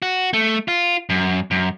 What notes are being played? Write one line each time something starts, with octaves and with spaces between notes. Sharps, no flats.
F#4
A3
F4
F#2
F#2